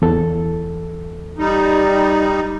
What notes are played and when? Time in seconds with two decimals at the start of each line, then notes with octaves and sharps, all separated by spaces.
0.02 E2 A4
1.38 G3 D#4